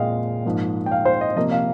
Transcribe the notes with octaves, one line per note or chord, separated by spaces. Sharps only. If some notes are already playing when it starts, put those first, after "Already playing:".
Already playing: A#2 G#3 D#5 F5 G5
G#2 F3 A#3
G5
F5
C5
D#5
C3 F3 A#3 D#5
F5